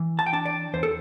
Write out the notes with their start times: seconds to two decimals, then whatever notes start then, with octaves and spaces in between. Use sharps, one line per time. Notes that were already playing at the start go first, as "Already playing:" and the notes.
Already playing: E3
0.19 A5
0.26 G5
0.33 D4 A5
0.45 D5
0.74 E2 C5
0.83 A4